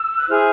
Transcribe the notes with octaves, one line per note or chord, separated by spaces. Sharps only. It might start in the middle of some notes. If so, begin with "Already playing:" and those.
Already playing: E6
F#6
E4 G#4 C5 F6